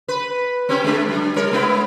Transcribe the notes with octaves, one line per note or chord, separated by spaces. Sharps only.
B4
C4 C#4 G4
G#3 A3 D4
F#3 D4
G3 A#4 C#5
G#3 B3 E4